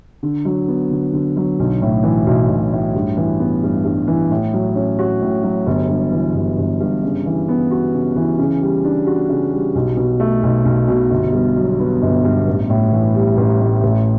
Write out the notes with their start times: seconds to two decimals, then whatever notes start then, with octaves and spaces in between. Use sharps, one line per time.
0.23 D3
0.45 F#3
0.68 B3
0.91 D3
1.13 D3
1.37 F#3
1.59 B1
1.82 A2
2.03 E3
2.27 B1
2.49 B1
2.72 A2
2.95 G2
3.17 E3
3.39 B3
3.63 G2
3.85 G2
4.07 E3
4.31 A2
4.54 F#3
4.75 C#4
4.99 F#4
5.22 A2
5.43 F#3
5.67 G1
5.89 G2
6.11 E3
6.34 G1
6.58 G1
6.80 G2
7.03 C#3
7.26 E3
7.48 B3
7.71 F#4
7.94 C#3
8.16 E3
8.39 C#3
8.61 G3
8.84 D4
9.07 F#4
9.29 C#3
9.53 G3
9.75 B1
9.97 B2
10.20 A3
10.43 B1
10.65 B1
10.88 B2
11.11 G1
11.33 G2
11.56 F#3
11.80 B3
12.02 G1
12.24 G2
12.47 A1
12.70 A2
12.92 E3
13.15 G3
13.37 A1
13.61 A2
13.83 A1